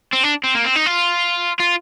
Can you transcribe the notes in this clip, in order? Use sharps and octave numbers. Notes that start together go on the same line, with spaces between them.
C4
D4
C4
A#3
C4
D#4
F4
F4